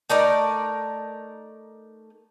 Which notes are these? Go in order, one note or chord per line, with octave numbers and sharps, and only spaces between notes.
A3 D#4 A#4 D5